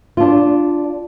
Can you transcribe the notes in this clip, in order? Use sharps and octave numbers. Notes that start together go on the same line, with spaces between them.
D4 F4